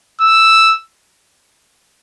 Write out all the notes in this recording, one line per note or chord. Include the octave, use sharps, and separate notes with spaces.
E6